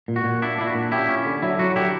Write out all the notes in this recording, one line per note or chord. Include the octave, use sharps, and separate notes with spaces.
A#2
F#4
A#2
D4 E4
D4 E4
F#4
A#2
C#4 E4 G4
C#4
D3
F#3 E4
F#3 F#4
D3 E4 G4